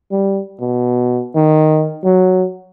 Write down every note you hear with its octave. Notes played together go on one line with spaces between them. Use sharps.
G3
B2
D#3
F#3